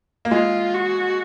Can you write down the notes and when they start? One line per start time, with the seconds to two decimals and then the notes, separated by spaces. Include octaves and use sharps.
0.25 A#3
0.31 G#3 F4
0.74 F#4